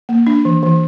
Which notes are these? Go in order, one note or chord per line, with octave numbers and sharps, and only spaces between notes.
A#3
D4
E3
E3